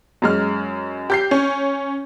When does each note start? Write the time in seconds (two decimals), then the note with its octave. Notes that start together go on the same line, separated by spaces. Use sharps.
0.22 F#2 G#3 F6
1.10 G4 G6 C7
1.31 C#4